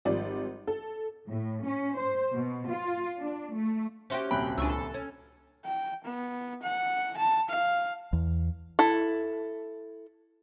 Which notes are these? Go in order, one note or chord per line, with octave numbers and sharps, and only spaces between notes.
G#1 F3 G3 D5
A4
A2
C#4
C5
B2
F4
D4
A3
C#4 F#4 G4 C5 E5 C6
D#1 C2 G5 B5 F#6
C#2 D4 G#5 C#6 E6
A4
C#4
G5
B3
F#5
A5
F5
E2
E4 A4